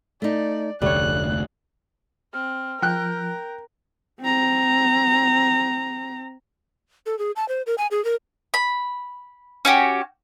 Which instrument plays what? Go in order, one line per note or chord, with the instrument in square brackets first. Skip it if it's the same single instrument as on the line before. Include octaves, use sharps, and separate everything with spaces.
[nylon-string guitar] A3 D#4 [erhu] D5
[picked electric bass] F1 D2 [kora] G3 C#5 [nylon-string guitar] A3 [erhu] F#6
[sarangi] C4 [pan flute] F6
[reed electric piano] F3 [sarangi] A#4 [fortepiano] G5 F#6
[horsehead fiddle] C4 A#5
[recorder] A4
G#4
A5
C5
A#4
G#5
G#4
A#4
[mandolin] B5
C#4 F#4 G4